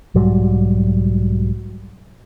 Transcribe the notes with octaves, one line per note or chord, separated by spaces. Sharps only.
B1 G#2 F#3 G3